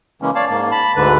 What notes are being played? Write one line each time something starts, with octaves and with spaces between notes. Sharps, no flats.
C#3 E3 G#3 A#3 C#4
C#5 D5 F5 A5
G#2 A#3
A5 B5
D2 G#2 D3 B4